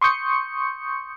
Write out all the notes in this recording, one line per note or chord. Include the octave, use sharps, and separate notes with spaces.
C6 C#6 D#6 G6 C#7